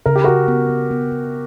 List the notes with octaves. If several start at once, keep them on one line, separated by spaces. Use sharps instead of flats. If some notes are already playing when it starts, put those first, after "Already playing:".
C#3 A#4
G4
C#3 F#4 A#4
B3
B3
B3
C#3